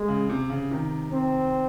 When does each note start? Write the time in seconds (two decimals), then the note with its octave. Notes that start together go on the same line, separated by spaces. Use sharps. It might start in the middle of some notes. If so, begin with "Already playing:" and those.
Already playing: G#3
0.08 C#3
0.30 C3
0.50 C#3
0.71 C3 D#3
1.12 C4